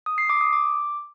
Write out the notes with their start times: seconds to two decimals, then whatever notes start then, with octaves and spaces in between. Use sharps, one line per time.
0.06 D#6
0.18 C7
0.30 D6
0.41 D#6
0.53 D6